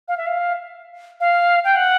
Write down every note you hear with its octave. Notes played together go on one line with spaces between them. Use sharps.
F5
E5
F5
F5
G5
F#5